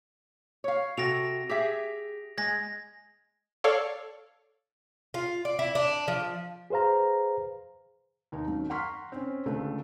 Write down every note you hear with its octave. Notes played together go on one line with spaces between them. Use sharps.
C#5 F5
C3 F#4 A4 A#6 D7 F7
G4 G#4 E5
G#3 G#6 A#6
A4 C#5 D5 F5
F4
D5
E4
D4
F3
G#4 B4 C5 F5 A#5
D#2 D#4
F#2 D#3
F#5 A#5 C6 C#6 F6 B6
C4 C#4
C#2 D3 A3